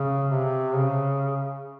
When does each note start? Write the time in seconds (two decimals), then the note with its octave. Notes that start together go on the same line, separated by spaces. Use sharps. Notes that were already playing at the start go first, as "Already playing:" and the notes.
Already playing: C#3
0.31 C3
0.75 C#3